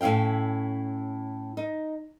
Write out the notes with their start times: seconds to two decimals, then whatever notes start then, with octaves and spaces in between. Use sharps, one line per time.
0.01 A2 C#4 E4 F5 G5
1.57 D#4